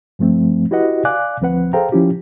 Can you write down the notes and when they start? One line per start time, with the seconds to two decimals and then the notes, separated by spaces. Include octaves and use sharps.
0.19 G2 F3 A3 C4
0.71 E4 F#4 G4 B4 D#5 F#5
1.05 D5 F5 G#5 D6 F#6
1.41 D2 F3 C4 B4 F#5
1.73 G#4 A4 C5 F5 G5 A#5
1.92 F3 C#4 E4 F4 G4